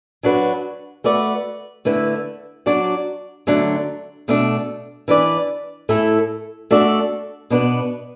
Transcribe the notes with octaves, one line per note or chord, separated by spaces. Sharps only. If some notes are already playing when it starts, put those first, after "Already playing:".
F#3 D4 F#4 B4
A3 F#4 B4 D5
D3 A3 E4 B4
F#3 D4 F#4 D5
D3 F#3 A3 D4
B2 A3 D4
E3 D4 B4 D5
A2 A3 E4 A4
A3 D4 F#4 A4 D5
B2 B3 D4 B4